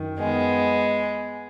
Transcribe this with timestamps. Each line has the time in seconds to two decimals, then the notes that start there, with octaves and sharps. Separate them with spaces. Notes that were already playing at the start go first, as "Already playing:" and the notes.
Already playing: F#2 D#3
0.19 G#3 B3